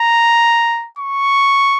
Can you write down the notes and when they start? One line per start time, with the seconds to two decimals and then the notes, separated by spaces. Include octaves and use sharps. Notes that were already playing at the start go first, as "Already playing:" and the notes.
Already playing: A#5
0.99 C#6